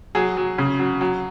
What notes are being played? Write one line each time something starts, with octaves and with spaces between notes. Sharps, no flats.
F#3 G#4
F#3
C#3
F#3
F#3